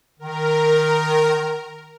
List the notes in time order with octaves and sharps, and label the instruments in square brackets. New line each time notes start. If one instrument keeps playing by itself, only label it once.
[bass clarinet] D#3 [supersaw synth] A#4